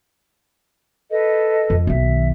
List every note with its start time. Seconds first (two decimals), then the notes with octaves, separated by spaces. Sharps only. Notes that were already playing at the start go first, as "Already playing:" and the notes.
1.11 A4 B4 D#5
1.70 F2
1.87 B1 D#3 E5